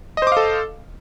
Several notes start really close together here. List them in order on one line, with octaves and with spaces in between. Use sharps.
D#5 C5 D6 F5 A4